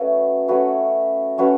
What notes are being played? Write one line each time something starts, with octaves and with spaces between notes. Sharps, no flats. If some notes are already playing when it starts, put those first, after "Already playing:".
Already playing: A3 C#4 F#4 B4
A3 C#4 F#4 B4
A3 C#4 F#4 B4